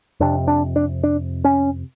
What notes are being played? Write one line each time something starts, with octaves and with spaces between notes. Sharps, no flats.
F2 C3 D4
D4
D4
D4
C#4